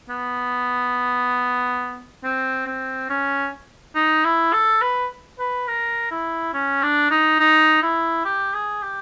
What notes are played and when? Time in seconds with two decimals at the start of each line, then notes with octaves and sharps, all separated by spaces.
0.09 B3
2.24 C4
2.67 C4
3.09 C#4
3.95 D#4
4.24 E4
4.53 A4
4.81 B4
5.39 B4
5.68 A#4
6.11 E4
6.53 C#4
6.83 D4
7.10 D#4
7.39 D#4
7.82 E4
8.25 G4
8.54 G#4
8.82 G4